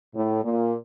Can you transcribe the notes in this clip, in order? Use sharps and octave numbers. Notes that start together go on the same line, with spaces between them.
A2
A#2